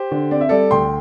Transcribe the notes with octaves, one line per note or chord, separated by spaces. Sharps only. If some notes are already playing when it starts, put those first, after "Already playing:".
Already playing: G4 C5
D3
C4 D5
E5
G3 A4 D5
D2 G5 C6